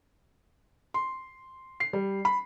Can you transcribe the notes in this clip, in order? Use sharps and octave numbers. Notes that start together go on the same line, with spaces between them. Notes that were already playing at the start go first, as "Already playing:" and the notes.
C6
C7
G3
B5